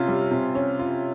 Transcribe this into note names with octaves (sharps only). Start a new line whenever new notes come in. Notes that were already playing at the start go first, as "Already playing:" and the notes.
Already playing: C3 C#4 F4
G3
C3
C#4
F4